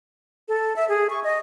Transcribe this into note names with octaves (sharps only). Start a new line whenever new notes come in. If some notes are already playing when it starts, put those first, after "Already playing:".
A4
E5
G#4
C#6
D#5